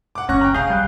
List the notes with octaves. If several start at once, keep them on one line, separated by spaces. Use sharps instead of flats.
F#5 D6
F#1 C#4 C#6 F#6 A#6
G5 A#5
B1 G#4 F5 G6
G3 G5 F#6